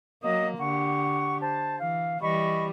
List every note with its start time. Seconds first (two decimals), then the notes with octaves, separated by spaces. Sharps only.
0.22 F#3 A#3 D#5 D#6
0.59 D3 G4 F#5 C#6
1.40 C5 A5
1.80 E3 F5
2.21 E3 G3 D#5 B5 C#6